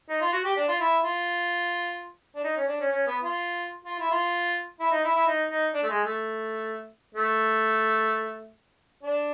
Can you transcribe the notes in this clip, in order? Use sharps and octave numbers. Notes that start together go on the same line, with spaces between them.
D#4
F4
F#4
G4
D4
F4
E4
F4
D4
D#4
C#4
D4
C#4
C#4
B3
F4
F4
E4
F4
E4
D#4
E4
E4
D#4
D#4
D4
A3
G#3
A3
A3
D4